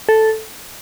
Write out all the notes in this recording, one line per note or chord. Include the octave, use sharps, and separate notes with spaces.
A4